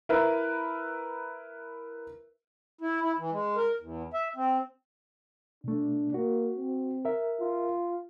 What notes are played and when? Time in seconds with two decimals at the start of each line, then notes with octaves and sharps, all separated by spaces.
0.09 E4 A#4 B4 E5
2.81 E4
3.01 E4
3.18 E3
3.31 G#3
3.56 A#4
3.80 E2
4.14 E5
4.36 C4
5.64 B2 A3 D4
6.14 A#3 F#4
6.56 C4
7.05 A#4 E5
7.40 F4